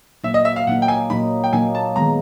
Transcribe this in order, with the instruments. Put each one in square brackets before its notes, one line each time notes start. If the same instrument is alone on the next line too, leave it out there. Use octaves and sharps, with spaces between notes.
[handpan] A#2 F#3 A#3 D#4 [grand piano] E5
[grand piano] D#5
E5
F5
[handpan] A#2 F#3 A#3 D#4 [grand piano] F#5
[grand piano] G5
G#5
[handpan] A#2 F#3 A#3 D#4 [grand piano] B5
[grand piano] G5
[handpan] A#2 F#3 A#3 D#4 [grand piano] G#5
[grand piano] A5
[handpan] D#3 G#3 B3 [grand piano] A#5